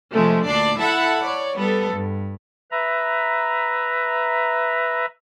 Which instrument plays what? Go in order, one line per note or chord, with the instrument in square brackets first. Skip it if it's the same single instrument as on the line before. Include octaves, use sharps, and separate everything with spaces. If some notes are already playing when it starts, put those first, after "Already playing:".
[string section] C3 F3 G#3 A3
D2 A#2 D4 D5 C7
E4 A4 E5 F#5 A5 B5
C#5 D5
G3 B3 A4
G2
[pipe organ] B4 E5 A#5